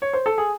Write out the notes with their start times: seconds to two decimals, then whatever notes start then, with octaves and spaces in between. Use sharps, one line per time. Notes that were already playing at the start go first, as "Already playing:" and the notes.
0.02 C#5
0.14 C5
0.26 A4
0.38 G#4